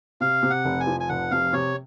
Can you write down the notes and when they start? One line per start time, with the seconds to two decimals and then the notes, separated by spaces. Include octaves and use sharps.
0.21 C3 F5
0.43 C3
0.50 F#5
0.65 F1
0.80 G#5
0.87 F3
1.00 G#5
1.09 F1 F#5
1.31 C3 F5
1.53 C3 C#5